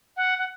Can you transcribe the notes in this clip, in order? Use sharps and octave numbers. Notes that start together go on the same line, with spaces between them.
F#5
F#5